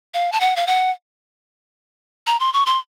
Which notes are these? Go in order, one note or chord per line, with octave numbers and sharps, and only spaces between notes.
F5
A5
F#5
F5
F#5
A#5
C6
C#6
C6